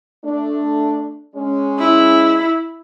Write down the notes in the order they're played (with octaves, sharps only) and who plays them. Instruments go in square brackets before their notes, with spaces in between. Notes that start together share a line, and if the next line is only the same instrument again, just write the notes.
[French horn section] A3 D4
G#3 C#4
[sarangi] E4